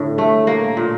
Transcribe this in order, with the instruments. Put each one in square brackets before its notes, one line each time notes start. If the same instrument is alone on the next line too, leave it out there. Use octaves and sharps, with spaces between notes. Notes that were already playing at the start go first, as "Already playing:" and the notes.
Already playing: [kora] A2 D3
A3
A#3
A#2